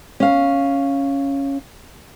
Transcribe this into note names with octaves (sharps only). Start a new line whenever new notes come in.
C#4 F5